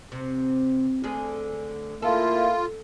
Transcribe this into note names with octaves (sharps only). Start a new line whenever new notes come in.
C3
D2 D3 G#4
A#3 E4 F4 A4